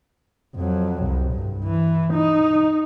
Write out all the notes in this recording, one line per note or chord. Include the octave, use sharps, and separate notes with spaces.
F2 F#3
C2
G2
E3
D#4